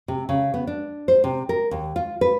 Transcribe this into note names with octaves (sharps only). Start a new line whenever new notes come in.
C3
C#3
B3
D4
C5
C3
A#4
D#2
F4
B4